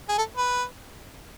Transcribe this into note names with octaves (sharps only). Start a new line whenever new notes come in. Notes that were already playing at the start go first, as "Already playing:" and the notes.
G#4
A4
B4